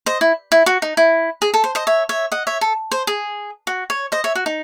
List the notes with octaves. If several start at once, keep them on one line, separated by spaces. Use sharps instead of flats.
C5 D#5
E4
E4
F#4
D#4
E4
G#4
A4
C5
C5 D#5
C#5 E5
C#5 E5
D#5 F#5
C#5 E5
A4
C5
G#4
F#4
C#5
C5 D#5
C#5 E5
F#4
D#4